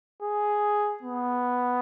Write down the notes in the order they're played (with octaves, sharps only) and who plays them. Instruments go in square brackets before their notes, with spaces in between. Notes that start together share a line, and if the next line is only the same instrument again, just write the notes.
[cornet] G#4
B3